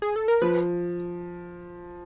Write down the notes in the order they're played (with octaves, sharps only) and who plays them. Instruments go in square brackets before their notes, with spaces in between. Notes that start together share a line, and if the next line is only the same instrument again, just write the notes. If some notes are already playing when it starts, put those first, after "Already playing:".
[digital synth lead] G#4
A4
A#4
[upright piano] F3 [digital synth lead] B4